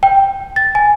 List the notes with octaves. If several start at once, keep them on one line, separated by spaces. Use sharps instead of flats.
G5
A6
G#5